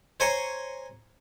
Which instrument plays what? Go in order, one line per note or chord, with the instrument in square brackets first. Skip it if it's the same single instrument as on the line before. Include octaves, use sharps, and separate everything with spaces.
[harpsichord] C5 C#5 G#5 A#5 C6 C#6